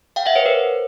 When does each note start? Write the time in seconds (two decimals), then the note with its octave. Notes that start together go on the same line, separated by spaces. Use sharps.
0.16 F5 G5
0.26 E5 F#5
0.35 B4 C#5
0.45 A#4 C5